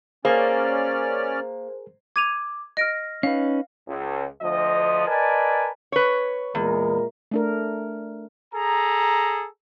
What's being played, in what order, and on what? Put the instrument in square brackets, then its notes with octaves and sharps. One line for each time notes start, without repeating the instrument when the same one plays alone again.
[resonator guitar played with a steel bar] A#3 [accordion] C#4 D5 F6 [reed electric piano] G#4 A#4 [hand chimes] C5
[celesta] D6 [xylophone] G#6 D#7 F7
[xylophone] D#5 D7 [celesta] F6 A#6
[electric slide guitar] C#4 D#4 B4 [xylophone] F5
[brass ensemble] C#2
D2 F3 D#5
A#4 B4 D5 D#5 G#5 A5
[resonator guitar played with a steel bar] B4 C#5
[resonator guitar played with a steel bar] E2 [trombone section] A#2 G#3 A#4
[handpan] A3 D4 A#4
[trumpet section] G#4 A4 A#5